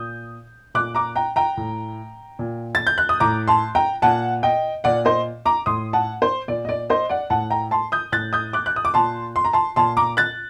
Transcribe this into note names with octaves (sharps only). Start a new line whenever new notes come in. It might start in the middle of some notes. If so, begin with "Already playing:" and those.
Already playing: A#2 D#6 G6
A#2 D6 F#6
A#5 D6
G5 A#5
G5 A#5
A2
A#2
A6
G6
F#6
D#6
A2 A#5 D6
A5 C6
G5 A#5
A#2 F#5 A5
D#5 G5
A#2 D5 F#5
C5 D#5
A#5 D6
A2 C6 D#6
F#5 A5
C5
A#2 D5
D#5
D5
C5 D#5
D5 F#5
A2 F#5 A5
G5 A#5
A5 C6
D#6 G6
A2 F#6 A6
D#6 G6
D6 F#6
F#6
D#6
D6
A#2 A5 C6
C6
A#5
A5 C6
A#2 A5 C6
A#5 D6
F#6 A6